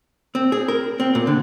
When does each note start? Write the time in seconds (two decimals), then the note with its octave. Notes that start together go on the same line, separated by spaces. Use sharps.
0.35 C4
0.52 G#4
0.68 A#4
1.00 C4
1.15 A#2
1.27 D3